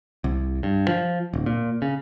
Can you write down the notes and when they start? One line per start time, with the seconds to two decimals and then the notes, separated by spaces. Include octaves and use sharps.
0.24 C2
0.63 G2
0.88 F3
1.33 D1
1.46 A#2
1.82 C#3